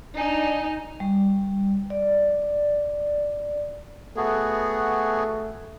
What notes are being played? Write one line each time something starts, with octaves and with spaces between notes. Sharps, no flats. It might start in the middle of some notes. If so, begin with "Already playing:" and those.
D4 D#4 G#5
G3
D5
A3 B3 F#4 G#4